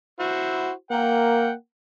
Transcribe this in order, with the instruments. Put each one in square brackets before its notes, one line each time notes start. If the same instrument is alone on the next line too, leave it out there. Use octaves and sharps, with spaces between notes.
[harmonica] E4 F#4 C5
[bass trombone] A#3 [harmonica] A#4 F#5 G5